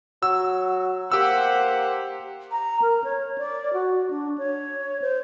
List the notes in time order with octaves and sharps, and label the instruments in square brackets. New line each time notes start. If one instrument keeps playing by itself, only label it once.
[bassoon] F#3 [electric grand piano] E6
[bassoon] A#3 [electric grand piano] G4 E6 [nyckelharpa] C5 F#5
[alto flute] A#5
A#4
C#5
D5
F#4
D4
C#5
C5